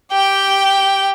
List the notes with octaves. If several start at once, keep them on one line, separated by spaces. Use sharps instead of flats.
G4 G5